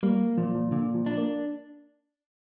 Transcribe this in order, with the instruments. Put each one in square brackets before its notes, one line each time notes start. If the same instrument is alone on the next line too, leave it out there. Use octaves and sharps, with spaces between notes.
[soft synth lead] G3 [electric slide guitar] A#3
[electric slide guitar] A#2 [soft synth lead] F3
[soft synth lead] F3
[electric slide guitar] A#2 [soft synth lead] D3
[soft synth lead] F3
[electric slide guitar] D4
[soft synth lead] A#3